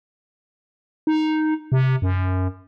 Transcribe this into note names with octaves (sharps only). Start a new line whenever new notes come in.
D#4
C3
F#2